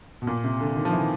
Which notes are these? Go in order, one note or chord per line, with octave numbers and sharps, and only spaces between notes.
B2
A#2
C3
D3
D#3
F3
E3
D#3